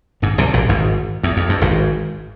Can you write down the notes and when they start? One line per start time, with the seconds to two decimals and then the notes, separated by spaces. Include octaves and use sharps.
0.22 G#1 G#2
0.38 C2 C3
0.53 A#1 A#2
0.69 G#1 G#2
1.23 E2
1.37 F2
1.49 G2
1.61 G#1 G#2